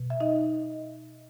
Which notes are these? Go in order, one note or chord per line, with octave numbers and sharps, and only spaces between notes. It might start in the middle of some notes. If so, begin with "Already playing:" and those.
Already playing: B2
E5
D#4 D#5